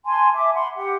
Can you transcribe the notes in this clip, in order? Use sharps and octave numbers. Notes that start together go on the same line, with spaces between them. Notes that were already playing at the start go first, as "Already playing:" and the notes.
G#5 A5 C6
E5 D6
F#5 B5 C6
G4 F#5